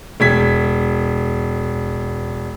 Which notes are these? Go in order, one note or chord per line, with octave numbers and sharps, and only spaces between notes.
E1 G#6 B6